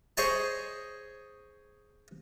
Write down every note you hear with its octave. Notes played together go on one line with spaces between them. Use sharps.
G#4 C5 C#5 D#5 G#5 A5